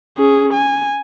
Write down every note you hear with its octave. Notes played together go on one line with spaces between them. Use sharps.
C#4 G#4
G#5